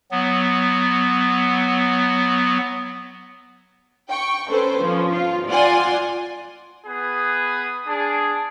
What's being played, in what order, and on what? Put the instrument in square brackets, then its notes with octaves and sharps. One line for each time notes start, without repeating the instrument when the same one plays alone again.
[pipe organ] F#3 B3
[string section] G5 C#6
C#4 A4 B4 C5
F3 C#4
F4
F4 D5 F#5 G#5 C6
[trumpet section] B3 G#4 B4 D#6
D4 G#4